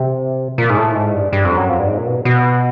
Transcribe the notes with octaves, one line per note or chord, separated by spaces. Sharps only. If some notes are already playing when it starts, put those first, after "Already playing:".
Already playing: C3
A#2
G#2
A2
G#2
G2
G2
F2
F#2
F2
G2
G#2
A#2
B2
B2